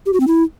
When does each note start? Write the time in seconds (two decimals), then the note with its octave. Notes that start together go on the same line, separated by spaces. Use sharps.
0.06 G4
0.13 F#4
0.20 C4
0.28 E4